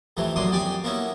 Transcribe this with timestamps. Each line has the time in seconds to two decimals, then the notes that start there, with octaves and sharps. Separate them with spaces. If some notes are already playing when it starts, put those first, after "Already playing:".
0.17 F2 C3 E3 A3
0.36 F#2 A2 D4 C6 D6 D#6
0.52 F2 G4 D5 G#5 D6 D#6
0.84 A#3 B3 C#4 E4